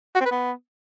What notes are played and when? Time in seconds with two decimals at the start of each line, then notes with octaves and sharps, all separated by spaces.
0.15 F#4
0.20 C4
0.26 B4
0.31 B3